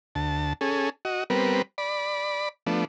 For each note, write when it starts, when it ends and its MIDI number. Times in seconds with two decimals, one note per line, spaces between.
0.15 0.53 38
0.15 0.53 81
0.61 0.89 61
0.61 0.89 68
0.61 0.89 69
1.05 1.24 66
1.05 1.24 75
1.30 1.62 55
1.30 1.62 59
1.30 1.62 60
1.30 1.62 70
1.30 1.62 71
1.78 2.49 74
1.78 2.49 83
2.67 2.85 53
2.67 2.85 57
2.67 2.85 59
2.67 2.85 62